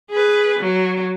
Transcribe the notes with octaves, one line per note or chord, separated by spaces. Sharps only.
G#4 B4
F#3